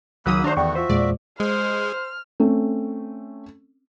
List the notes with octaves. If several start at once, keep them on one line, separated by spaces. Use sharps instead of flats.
C#2 D#3 F#3 A#3 B5 D#6 E6 F#6
F#3 A3 D4 C5 A#5
E2 A3 B3 F#4 D5 G5 C#6
F4 F#4 C5 E5
E2 A#2 G#3 D5
G#3 C5 F6
A3 C4 C#4